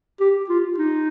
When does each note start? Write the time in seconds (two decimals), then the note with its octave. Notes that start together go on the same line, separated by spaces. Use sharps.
0.20 G4
0.49 F4
0.78 D#4